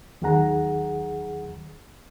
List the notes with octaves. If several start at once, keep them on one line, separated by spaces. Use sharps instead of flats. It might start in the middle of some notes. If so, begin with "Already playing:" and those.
D#2 D#3 F#3 G#4 F#5 A#5